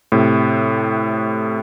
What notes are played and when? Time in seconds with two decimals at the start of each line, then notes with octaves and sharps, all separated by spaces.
0.12 A2 C3